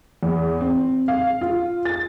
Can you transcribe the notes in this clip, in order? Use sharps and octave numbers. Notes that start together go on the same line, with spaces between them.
E2
C4
F5
F4
A6